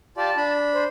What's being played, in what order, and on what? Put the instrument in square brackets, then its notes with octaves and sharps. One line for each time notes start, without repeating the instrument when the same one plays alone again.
[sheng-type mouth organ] F4 G4 D5 [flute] A5
[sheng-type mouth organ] D4 B5
[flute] C5